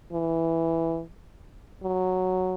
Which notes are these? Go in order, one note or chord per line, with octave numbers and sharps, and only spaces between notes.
E3
F#3